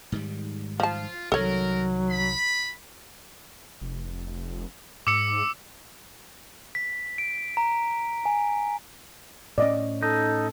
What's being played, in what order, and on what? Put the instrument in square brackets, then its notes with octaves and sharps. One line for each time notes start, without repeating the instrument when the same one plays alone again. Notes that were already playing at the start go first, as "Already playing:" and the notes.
[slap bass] G#2 D#3 G3
[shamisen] F3 A5 [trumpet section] F4
[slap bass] C2 D#3 [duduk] F#3 [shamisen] A4 C#5 [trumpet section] A#4
[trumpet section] B5
[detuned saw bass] F1
[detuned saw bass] G#2 [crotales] D6 E6 C#7
[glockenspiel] B6
D7
A#5
G#5
[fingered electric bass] A2 C#4 [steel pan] D5 D#5
[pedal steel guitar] D#4 [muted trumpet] A4